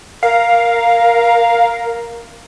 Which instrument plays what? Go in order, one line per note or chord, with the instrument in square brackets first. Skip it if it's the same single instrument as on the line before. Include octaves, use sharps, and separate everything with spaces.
[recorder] A#4 [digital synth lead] F5